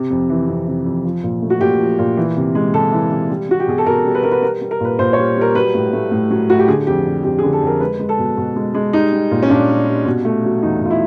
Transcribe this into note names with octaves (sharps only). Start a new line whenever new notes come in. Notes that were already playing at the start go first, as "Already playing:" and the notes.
Already playing: C3
F2
E3
F2
C3
F2
F3
A#2
A3
F#4
A#2 G4
F3
A#2
E3
C3
G#3
C3 A4
E3
C3
G3
G3 F#4
G4
B2 G#4
A4
B2 A#4
G3
B4
G3 A#4
B4
G3 A#4
G3
A#4
A#2 B4
A#2 C5
C#5
G3
G3 A#4
F#3 B4
A2
A3
A2
F#3
A2 F#4
G4
D3 G#4
F2 G4
G3
F2 G4
G#4
D3
A4
F2
A#4
G#3 B4
G#3
A4
B2
B2
G#3
G#3
G3 D#4
G3
A#2
C#4
A#2 D4
G3
G3
B2
A3
F#3
E2 D#4
B2 F4
E4